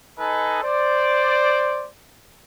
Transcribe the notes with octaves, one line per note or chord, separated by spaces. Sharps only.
D#4 A4 B4 D#5 G#5
C5 D5